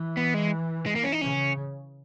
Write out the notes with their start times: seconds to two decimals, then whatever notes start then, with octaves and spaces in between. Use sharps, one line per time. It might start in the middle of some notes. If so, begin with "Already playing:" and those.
Already playing: E3
0.17 B3
0.34 G#3
0.86 G#3
0.96 A#3
1.04 C#4
1.12 D#4
1.21 C#3 C#4